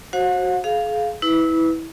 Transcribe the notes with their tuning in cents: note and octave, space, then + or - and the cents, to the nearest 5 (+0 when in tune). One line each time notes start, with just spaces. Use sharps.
F#4 +0 C5 +35 F#5 -45
G#4 +35 F5 +0
E4 -20 B4 +15